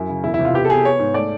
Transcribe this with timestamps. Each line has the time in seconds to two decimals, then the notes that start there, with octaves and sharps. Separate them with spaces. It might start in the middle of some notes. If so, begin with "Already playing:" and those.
Already playing: F#2 E4
0.09 C#3
0.24 E1 E4
0.34 E4
0.39 C3
0.45 F4
0.54 B3 G4
0.65 A4
0.70 B3 G#4
0.85 B3 C#5
1.00 G#2
1.14 A3 D5